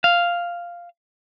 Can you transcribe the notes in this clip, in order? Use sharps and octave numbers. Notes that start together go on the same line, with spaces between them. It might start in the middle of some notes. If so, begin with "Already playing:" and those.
F5